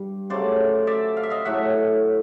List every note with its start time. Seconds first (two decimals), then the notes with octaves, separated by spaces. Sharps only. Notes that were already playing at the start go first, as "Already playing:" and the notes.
Already playing: G2 G3
0.30 C#3 F#3 A3 C5 D5
0.87 D5 E5
1.17 F5
1.23 E5
1.30 D#5 F5
1.45 A2 F#3 A3 E5 F#5